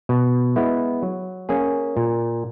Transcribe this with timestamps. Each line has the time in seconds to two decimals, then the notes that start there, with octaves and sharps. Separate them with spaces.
0.09 B2
0.56 G#3 B3 E4
1.02 F#3
1.49 A#3 C#4 G#4
1.97 A#2